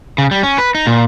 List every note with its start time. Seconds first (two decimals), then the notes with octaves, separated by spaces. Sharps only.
0.18 C#3
0.31 G3
0.43 C#4
0.58 B4
0.75 D#4
0.87 A#2